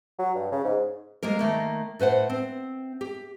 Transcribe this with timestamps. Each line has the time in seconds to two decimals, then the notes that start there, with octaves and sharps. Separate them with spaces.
0.19 F#3
0.35 G2
0.52 C#3
0.64 G#2
1.23 G3 G#3 A#3 A#4
1.39 D#3 A3 A#3
1.99 A2 B4 C5 F#5
2.30 C4
3.01 G4